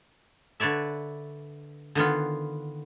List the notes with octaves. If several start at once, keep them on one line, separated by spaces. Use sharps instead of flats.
D3 B4 C#5 D5 E5
D3 D#3 B3 F4